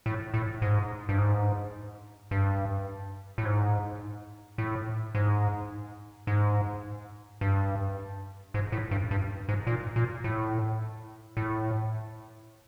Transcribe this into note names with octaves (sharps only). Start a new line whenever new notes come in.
A2
A2
G#2
G2
G#2
G2
A2
G#2
A2
G#2
G#2
G2
G#2
A2
G2
G2
G#2
A#2
A#2
A2
A2